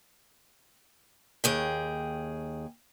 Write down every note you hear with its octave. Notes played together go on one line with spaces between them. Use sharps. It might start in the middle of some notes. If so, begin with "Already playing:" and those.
D#2 G#4 G5